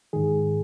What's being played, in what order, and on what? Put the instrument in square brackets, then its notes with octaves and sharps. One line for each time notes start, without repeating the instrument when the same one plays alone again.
[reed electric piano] G#2 D#3 G#4